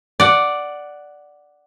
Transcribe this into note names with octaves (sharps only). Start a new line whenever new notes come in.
D5 F#5